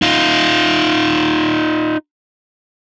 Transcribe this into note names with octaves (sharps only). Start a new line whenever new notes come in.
D#4 F4